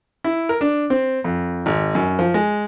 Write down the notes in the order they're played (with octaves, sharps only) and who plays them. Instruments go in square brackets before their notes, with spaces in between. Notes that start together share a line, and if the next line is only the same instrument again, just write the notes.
[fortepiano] E4
A#4
D4
C4
F2
G#1
F#2
F3
G#3